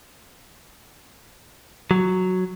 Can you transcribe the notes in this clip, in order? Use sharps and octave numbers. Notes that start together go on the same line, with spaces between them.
F#3